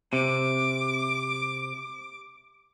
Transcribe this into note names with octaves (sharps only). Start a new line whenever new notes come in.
C3 D6